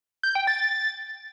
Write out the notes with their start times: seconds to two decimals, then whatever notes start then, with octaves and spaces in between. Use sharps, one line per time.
0.23 G6
0.35 G5
0.47 A6